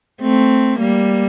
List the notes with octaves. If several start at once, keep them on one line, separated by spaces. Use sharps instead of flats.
A3 C4
G3 A#3